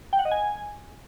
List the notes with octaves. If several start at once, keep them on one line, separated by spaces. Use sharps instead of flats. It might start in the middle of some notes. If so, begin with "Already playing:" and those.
G5
F#5
D#5
G#5